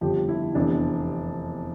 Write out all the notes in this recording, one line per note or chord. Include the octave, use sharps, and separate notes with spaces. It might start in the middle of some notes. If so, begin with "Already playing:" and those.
G1 F2 D3 F3 G4
E4
F1 E2 E3 D4